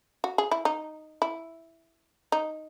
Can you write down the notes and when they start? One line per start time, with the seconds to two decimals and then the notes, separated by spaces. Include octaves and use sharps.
0.24 F#4
0.38 G#4
0.51 E4
0.65 D#4
1.22 E4
2.32 D#4